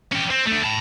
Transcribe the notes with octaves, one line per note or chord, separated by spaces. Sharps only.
C#4 G4
C4
A3 D4
A5 B5